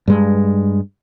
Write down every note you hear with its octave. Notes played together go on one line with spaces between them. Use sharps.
G2 G#3